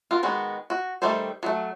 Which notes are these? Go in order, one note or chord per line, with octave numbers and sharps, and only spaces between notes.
F4 F#4 A#4
D#3 G#3 B3 F#4
F#4
D#3 G3 A3 A4 C5
F#3 A3